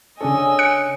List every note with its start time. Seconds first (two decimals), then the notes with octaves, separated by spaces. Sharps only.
0.21 C#3 C#4 D4 A4 C#5 D#5 G#5 E6
0.59 F#6 C#7 D7